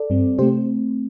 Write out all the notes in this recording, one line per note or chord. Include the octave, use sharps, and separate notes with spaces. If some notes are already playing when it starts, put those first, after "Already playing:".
Already playing: A4 D5
G2 G3 C4
C3 A3 C4 G4 C5